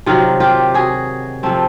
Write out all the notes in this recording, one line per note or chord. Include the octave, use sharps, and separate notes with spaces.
C3 D#3 F#3 F4
F4 G4
F#4 G#4
C3 F3 A3 C4